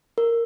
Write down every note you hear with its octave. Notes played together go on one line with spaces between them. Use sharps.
A#4